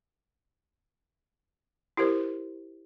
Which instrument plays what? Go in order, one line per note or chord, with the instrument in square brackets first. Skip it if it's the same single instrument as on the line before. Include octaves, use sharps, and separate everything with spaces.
[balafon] E4 G4 A#4 C5